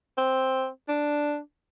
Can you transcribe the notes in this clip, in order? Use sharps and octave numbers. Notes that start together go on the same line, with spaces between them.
C4
D4